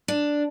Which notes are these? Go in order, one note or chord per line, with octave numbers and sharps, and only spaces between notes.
D4